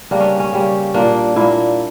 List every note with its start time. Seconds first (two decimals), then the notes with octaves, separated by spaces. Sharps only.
0.11 C#3 G3 A#3 D4
0.20 C#4
0.40 C#4
0.53 C#3 G3 A#3
0.94 A#2 A#3 D4
1.36 A#2 A#3 E4